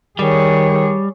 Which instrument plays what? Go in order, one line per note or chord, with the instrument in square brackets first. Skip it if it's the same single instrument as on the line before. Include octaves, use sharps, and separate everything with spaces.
[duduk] D#3 [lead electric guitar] G3 [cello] G#4 C#5